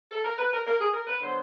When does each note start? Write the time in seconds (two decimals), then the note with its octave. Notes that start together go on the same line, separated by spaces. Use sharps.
0.10 A4
0.24 A#4
0.38 B4
0.52 A#4
0.66 A#4
0.80 G#4
0.93 A#4
1.07 B4
1.21 D3 F#3 B3 C5